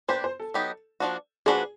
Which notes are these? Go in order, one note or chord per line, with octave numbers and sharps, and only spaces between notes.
A#3 D4 G4 B4 C5
C5
A4
F#3 B3 D#4 G4
F3 A#3 D4 F#4
F3 A#3 D4 F#4 G#4 B4